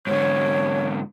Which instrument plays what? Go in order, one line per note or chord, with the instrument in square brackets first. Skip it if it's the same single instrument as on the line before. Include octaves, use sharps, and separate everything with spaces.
[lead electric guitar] G#2 D3 [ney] C#5